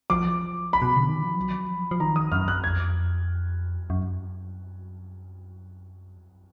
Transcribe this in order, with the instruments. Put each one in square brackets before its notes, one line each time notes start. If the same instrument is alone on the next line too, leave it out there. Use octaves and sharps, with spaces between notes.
[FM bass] F3 [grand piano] D6
[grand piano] B5
[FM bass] B2
D3
D#3
F3
F#3
F3
F3
[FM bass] D#3 [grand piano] A#5
[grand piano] D#6
[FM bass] F#2 [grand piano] F6
[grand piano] F#6
[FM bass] F2 [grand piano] G#6
[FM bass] F#2